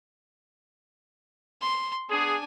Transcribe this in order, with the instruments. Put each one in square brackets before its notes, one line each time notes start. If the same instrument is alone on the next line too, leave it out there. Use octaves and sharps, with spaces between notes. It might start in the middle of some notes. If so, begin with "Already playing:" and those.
[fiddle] C6
[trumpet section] B3 G#4 [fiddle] D4 G#5